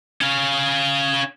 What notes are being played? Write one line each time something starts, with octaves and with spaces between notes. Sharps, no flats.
C#4 F5